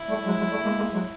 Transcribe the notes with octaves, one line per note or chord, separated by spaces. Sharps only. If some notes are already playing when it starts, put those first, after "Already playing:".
Already playing: E4
G3 A3
F#3 G#3
F#3 G#3
G3 A3
G#3 A#3
G#3 A#3
F#3 G#3